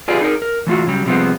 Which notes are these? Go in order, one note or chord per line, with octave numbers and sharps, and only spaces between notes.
F4 G4 G#4 B4 D5
D#4 G#4 A#4
A#4
E3 A3 F4 F#4
C#3 F#3 G3
C3 F3 G3 G#3 B3 C4